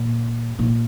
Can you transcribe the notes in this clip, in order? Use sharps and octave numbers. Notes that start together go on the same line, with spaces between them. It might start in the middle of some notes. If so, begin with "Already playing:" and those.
Already playing: A#2
A#2